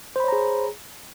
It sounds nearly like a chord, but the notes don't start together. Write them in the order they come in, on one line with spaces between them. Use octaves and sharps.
C5 B5 C#5 A#5 G#4